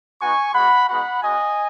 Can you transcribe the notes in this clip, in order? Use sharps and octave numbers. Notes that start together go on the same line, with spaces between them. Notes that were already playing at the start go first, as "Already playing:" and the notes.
B3 D#4 F#4 G#5 C#6
G#3 B3 F#4 F#5 B5
G#3 B3 D#4 F#4 F#5 B5
G#3 C#4 F#4 D#5 G#5